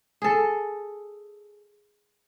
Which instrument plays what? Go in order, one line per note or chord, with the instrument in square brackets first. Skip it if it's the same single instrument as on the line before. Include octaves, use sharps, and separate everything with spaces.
[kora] G#4 A4